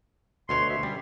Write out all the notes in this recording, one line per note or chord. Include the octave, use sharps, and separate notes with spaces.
D2 B2 C#5 C6
E5
G3 C#4